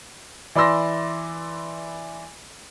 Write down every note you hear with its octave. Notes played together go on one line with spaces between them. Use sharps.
E3 D5 B5 C6 E6 A#6